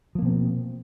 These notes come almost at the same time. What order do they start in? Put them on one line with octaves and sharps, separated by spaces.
F3 A#3 B2 C4